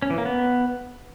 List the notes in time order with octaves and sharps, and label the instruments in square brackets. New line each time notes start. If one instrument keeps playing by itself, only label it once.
[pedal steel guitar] C#4
E3
A#3
B3